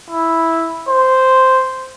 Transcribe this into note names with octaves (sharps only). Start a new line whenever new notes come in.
E4
C5